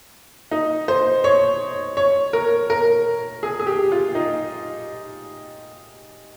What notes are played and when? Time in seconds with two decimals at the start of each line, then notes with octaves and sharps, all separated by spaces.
0.51 D#4
0.88 C5
1.24 C#5
1.97 C#5
2.33 A#4
2.70 A#4
3.43 G#4
3.60 G#4
3.67 G4
3.92 F4
4.15 D#4